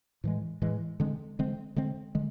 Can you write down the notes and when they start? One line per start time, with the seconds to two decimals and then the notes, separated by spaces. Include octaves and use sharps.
0.24 A2 E3 G#3
0.62 A2 E3 G#3
1.00 D3 G#3 C4
1.39 D3 G#3 C4
1.76 D3 G#3 C4
2.15 D3 G#3